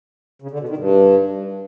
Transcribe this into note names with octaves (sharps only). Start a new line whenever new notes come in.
C#3
D3
B2
D#3
G2